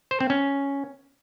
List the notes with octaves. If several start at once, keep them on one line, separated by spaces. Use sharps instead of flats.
C5
C4
C#4